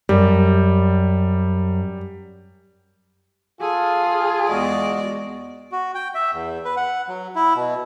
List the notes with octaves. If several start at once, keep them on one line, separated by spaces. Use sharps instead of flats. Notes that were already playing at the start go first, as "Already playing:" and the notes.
F#2 G3
F4 G#4 A4 G#5
E2 G#3 F#4 D5 D#5
F#4
G5
E5
E2
B4
F#5
F#3
E4
B2